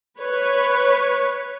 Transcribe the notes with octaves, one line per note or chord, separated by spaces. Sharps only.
B4 C#5